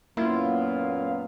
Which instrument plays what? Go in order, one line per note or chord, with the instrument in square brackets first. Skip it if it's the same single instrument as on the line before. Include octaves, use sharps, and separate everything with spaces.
[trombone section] F#2 A#2 B3 [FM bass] A#3 [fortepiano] E4 [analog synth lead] F4